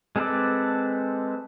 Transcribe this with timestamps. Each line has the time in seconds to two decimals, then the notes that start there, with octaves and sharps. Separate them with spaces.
0.16 G#3 C4 A4 B4 D5